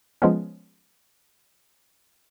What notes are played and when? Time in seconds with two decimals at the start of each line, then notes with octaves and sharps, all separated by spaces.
0.22 F3 G#3 B3 C#4